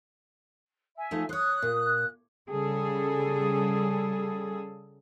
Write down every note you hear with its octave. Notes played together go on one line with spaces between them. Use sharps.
E5 G#5
F3 A3 D#4
C5 C#5 D#6 F#6
A#2
C#3 G3 G#4 A4